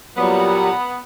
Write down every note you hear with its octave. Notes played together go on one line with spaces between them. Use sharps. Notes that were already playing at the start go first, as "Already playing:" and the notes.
A#2 F#3 G3 B3